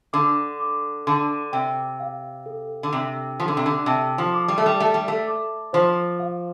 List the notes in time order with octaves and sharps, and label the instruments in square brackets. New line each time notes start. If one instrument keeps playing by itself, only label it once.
[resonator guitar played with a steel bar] D3 [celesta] D6
[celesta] D6
[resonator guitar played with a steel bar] D3 [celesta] C6
[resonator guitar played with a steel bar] C3 [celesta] G5
[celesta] F5
A4
[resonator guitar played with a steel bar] D3
[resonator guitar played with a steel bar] C3 [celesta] D4
[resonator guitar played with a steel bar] F3 [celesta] A4
[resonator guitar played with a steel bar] D3
C3
D3
[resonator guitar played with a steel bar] C3 [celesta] A5
[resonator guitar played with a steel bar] F3
[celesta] D6
[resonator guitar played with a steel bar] G3
A3
G3
[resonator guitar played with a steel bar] A3 [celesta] A5
[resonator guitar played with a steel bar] G3
A3
[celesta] D6
[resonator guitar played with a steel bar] F3 [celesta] C5
[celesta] F5